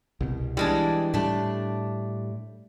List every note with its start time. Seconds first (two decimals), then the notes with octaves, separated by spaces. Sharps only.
0.21 C2 B2
0.57 E3 G3 G#3 D4
1.14 A2 G3 A3 D4